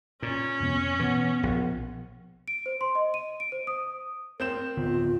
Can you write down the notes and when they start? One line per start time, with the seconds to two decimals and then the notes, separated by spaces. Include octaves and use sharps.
0.22 A#2 C#4
0.60 F2 C3 B3
1.00 B2 E3 B3
1.43 A#1
2.48 D7
2.66 C5
2.81 C6
2.95 D#5
3.14 D#7
3.40 D7
3.52 C5
3.67 D#6
4.40 C4 A#4 G6 E7
4.77 D1 D3 B3 F4